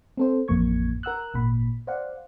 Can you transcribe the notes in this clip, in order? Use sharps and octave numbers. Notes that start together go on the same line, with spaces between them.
C4 A4 C5
A1 F2 A#3 C#6 G#6
A#4 F#5 E6 F#6
G#1 A#2 B5
C5 D5 F5 F#5